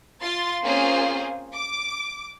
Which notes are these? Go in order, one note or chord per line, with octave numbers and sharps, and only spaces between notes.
F4 C6 A6
A#3 C4 C#4 F4 G#4 C5
D6